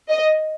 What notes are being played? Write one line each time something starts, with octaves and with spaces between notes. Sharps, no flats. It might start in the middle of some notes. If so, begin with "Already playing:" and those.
D#5